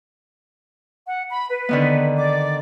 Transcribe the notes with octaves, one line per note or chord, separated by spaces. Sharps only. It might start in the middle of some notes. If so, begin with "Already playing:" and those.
F#5
B5
B4
D3 D#3 B3
D5 D6